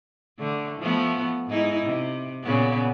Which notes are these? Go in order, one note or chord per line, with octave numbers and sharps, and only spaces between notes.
D3 A3
F3 A3 B3
G#2 D#4 E4
C3
A#2 C#3 B3